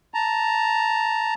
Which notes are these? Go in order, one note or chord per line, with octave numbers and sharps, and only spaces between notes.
A5 A#5